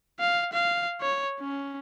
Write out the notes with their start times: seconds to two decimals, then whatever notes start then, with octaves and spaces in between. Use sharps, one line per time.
0.20 F5
0.53 F5
1.01 C#5
1.40 C#4